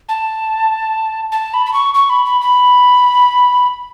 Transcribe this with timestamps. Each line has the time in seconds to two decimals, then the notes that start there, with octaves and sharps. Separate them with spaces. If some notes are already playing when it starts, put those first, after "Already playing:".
0.09 A5
1.32 A5
1.54 B5
1.66 B5
1.73 C#6
1.94 C#6
2.10 B5
2.25 B5
2.41 B5